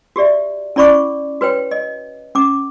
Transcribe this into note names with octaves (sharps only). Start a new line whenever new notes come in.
F#4 G4 D5 E5
C#4 E4 D5 B5 C#6 D6
F#4 B4 C#5 G5
D#5
C#4 D6